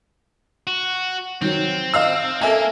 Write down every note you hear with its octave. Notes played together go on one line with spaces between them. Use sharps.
F#4
D#3 F#3 C4
D#5 F5 E6
A#3 A4 E5 G#5